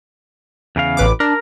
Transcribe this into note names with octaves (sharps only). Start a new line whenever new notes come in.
E2 C#3 F5
A1 B4 D6
D4 A#4